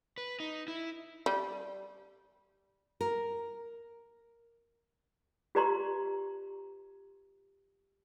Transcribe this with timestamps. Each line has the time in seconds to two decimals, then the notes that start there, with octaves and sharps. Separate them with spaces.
0.18 B4
0.40 D#4
0.68 E4
1.26 G3
3.01 A#4
5.55 F4 G4 B4 D5 A#5 C6